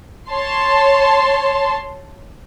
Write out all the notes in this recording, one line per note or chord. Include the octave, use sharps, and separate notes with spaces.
C#5 A5 C6